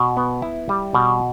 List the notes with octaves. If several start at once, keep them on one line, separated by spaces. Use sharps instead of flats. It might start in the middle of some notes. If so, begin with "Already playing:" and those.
Already playing: B2
B3
E4
G3
B2